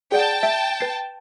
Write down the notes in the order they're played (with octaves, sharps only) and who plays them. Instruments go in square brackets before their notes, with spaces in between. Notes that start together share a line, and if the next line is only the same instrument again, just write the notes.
[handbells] G#4 D5 F#5 [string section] G5 A5
[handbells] E5
B4 A6 C7